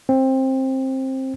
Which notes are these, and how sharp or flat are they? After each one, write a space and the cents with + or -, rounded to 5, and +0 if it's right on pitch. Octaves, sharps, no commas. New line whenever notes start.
C4 +15